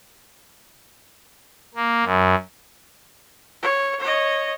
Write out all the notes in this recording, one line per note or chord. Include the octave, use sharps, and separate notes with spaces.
A#3
F#2
C#5
C#5 D#5